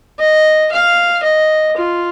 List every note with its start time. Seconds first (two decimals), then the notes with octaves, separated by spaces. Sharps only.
0.19 D#5
0.72 F5
1.23 D#5
1.77 F4